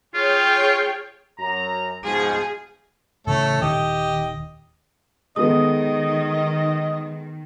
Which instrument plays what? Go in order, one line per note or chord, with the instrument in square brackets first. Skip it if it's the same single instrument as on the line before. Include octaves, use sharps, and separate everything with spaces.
[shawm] F4 [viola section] G#4 C#5 G5
[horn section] F#2 A#5
[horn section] G#2 B2 F3 [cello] G#4
[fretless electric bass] A2 C#3 E3 [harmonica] A3 A4 C#5
[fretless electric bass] D#1 D#3 [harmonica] G4 D#5
[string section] D#3 [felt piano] G#3 B3 A4 [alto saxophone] D#5 [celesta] D#6